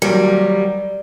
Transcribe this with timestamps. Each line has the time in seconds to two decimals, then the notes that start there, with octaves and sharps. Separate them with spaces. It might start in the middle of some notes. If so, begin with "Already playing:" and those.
0.02 D#2 F#3 G3 A#4